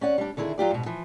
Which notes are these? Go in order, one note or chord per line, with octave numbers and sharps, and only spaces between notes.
C#4 D5 F#5
G3 D4
D3 D#3 E4 G#4
F#3 F4 G4 D5
G#2 B2
E3 F3